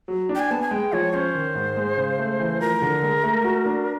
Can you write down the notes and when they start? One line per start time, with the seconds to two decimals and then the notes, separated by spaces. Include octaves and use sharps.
0.08 F#3
0.29 D4
0.35 G5
0.40 G#5
0.51 B3 A5
0.62 G#5
0.71 G#3 G5
0.93 F3 C#5
1.13 C#4 C5
1.35 D#3
1.55 G#2
1.77 G#3
1.97 C#3
2.19 A3
2.40 E3
2.60 F3 A#4
2.82 D3
3.03 G#3
3.24 A3
3.44 F#4
3.66 D4